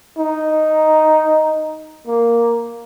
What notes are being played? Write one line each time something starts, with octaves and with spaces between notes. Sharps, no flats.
D#4
A#3